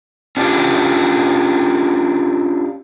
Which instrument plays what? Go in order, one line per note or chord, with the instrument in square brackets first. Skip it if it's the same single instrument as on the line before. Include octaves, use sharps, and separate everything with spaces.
[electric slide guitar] C#4 D4 F4 G4